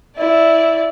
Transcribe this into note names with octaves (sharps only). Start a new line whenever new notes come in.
E4 D5